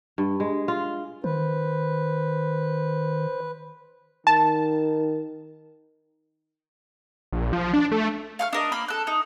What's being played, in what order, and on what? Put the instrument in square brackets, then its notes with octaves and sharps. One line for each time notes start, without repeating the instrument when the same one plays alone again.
[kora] G2
G#3
F4
[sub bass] D#3 [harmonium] B4 [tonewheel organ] C5
[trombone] D#3 [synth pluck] A5
[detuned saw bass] A#1
F3
D4
A3
[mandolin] F5 C#6 F6
D4 A#4 D#5
A#3 B5 F6
A4 F#6
D#4